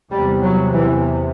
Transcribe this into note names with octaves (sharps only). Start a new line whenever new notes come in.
E2 C3 G3
F#3
E3